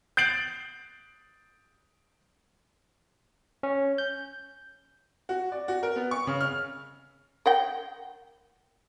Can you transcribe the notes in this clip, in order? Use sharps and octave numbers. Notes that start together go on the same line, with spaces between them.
G6 A6 C7 D7 F#7
C#4
G6
F#4
D5
F#4
A#4
B3
C#6
C#3
F6
A#4 F#5 G5